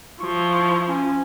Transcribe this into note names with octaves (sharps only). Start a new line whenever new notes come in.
F3 E4 C#6
C#4